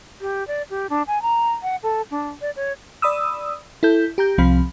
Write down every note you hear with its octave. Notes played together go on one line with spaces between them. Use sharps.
G4
D5
G4
D4
G#5
A#5
F#5
A4
D4
D5
C#5
D5 B5 D#6 E6
E4 A4 G6
G4 A#5 G6
C2 F3 C4 F5 B5